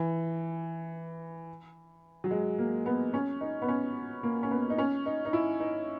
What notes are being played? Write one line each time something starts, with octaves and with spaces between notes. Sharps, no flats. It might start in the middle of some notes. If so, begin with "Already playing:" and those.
Already playing: E3
F#3
G#3
A#3
B3
C#4
D#4
B3
C#4
A#3
C#4
B3
D#4
C#4
D#4
D#4
E4
D#4